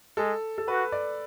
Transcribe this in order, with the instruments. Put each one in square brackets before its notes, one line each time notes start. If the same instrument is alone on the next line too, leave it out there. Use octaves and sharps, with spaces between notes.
[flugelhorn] G#3 [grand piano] A4
[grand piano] A4
[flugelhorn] F#4 [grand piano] B4
[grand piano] D5